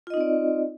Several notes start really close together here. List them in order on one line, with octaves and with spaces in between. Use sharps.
F4 D#5 D#4 C4 D5